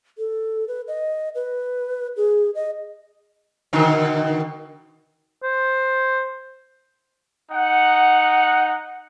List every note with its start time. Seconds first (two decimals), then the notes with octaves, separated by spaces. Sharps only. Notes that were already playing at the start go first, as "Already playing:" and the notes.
0.18 A4
0.68 B4
0.88 D#5
1.35 B4
2.17 G#4
2.55 D#5
3.73 B2 D3 D#3
5.42 C5
7.51 D#4 F#5